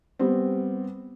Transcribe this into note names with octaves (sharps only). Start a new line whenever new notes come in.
G3 B3 C4